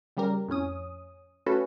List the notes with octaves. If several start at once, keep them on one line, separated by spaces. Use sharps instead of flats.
C#3 G3 G4 A#4
F2 A2 C#4 D#6
A3 C#4 F#4 A4 B4